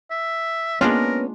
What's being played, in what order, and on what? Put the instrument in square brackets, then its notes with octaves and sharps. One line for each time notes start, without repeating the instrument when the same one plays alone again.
[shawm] E5
[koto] G#3 D4 F4 [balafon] A#3 [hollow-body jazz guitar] B3 C#4 [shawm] A#4